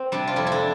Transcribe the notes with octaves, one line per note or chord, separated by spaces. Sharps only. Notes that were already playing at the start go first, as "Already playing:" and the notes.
Already playing: C4
C3 G3 D4
F4
F2 E4
E4
D4